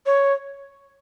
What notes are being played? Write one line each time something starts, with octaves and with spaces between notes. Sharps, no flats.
C#5